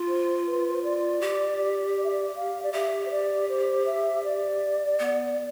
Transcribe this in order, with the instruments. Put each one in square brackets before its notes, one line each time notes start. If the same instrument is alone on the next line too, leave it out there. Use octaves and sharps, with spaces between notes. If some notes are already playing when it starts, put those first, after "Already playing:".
Already playing: [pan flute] F4
[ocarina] C5
B4
C5
D5
[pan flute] G4
[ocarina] D5
E5
D5
F5
D5
[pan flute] G4 [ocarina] E5
[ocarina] C5
D5
C5
E5
D5
[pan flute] B3